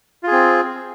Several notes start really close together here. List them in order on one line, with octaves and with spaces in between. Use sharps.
F4 G#4 C4